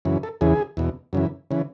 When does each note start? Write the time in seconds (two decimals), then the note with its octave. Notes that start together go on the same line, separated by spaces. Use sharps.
0.05 F#2 C#3 E3
0.23 A4
0.41 E2 C#3 E3 G#4
0.77 E2 B2
1.13 F#2 C#3 E3
1.51 C#3 E3